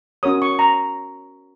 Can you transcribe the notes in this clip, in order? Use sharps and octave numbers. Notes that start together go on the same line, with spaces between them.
C#4 F#4 A#4 C#5 D#6
C#6
A#5